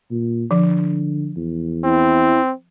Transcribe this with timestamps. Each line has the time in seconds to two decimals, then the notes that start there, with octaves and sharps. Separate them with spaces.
0.11 A#2
0.51 D3 F3
1.37 E2
1.84 C4 E4